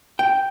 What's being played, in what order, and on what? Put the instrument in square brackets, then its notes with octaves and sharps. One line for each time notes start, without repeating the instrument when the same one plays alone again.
[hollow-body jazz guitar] G5